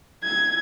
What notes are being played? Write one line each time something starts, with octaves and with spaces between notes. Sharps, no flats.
G#6